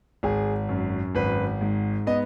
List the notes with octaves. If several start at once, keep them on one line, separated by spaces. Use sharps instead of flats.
G#1 G#4
F#2
G#1 B4
G#2
B3 D#5